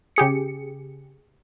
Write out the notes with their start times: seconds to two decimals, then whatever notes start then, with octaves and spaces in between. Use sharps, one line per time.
0.16 C#3 G4 G#4 C#7